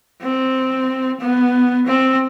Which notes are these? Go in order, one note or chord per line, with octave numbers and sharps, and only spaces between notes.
C4
B3
C4